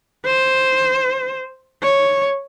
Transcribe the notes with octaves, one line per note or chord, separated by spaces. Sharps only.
C5
C#5